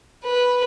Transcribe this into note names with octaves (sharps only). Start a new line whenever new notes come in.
B4